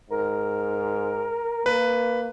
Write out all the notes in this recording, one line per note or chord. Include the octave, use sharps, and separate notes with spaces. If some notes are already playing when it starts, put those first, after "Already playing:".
G#2 A#4
A#3 B4